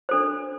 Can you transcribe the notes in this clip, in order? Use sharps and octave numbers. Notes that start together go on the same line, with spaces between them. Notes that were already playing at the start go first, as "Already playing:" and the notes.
D4 A4 C5